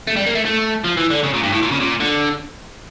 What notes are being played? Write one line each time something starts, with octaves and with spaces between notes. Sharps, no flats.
A3
G3
A#3
A3
A3
F3
E3
D3
C#3
A#2
G2
A2
A#2
C#3
A#2
D3